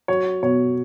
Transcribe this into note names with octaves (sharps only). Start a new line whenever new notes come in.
F#3 C#5
B2 C#5